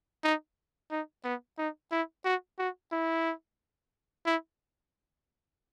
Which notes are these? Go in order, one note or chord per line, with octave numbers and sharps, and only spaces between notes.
D#4
D#4
B3
D#4
E4
F#4
F#4
E4
E4